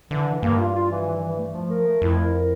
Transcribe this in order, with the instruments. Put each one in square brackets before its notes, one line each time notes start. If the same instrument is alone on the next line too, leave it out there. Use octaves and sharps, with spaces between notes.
[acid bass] D3 [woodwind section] E3
[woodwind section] E3
[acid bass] G2 [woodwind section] A#3
[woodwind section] F4
F4
E3
E3
E3
A3
F3
A#4
A3
[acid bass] F2 [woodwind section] E4
[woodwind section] A#4
A#4